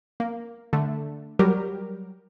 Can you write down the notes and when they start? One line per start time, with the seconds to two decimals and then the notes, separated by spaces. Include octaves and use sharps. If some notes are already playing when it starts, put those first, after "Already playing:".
0.20 A#3
0.73 D3 A3
1.39 F#3 G3 G4 A#4